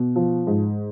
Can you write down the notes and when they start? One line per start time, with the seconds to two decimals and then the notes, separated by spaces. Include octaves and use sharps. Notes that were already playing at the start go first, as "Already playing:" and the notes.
Already playing: B2
0.16 F3
0.47 G#2